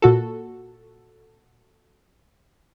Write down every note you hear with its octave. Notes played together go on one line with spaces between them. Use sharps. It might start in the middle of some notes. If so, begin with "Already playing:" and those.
A#2 F#4 A4